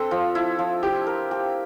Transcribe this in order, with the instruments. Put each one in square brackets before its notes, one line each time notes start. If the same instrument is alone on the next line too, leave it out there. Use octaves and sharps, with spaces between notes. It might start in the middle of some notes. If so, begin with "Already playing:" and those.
Already playing: [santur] C4 D4 C5 [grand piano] A4
[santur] F3
E4
F3
[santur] E4 [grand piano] G4
[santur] A#4
G4